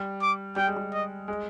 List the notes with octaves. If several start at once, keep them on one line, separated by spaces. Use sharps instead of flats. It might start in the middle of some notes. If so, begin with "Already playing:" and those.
Already playing: G3
D6
G3 G5
G#3
G3
D#5
G#3